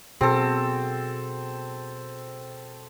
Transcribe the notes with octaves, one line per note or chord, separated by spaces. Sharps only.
B2 C4 F#4 G#4 A4